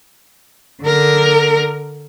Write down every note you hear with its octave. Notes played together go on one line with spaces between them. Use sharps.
D3 A#4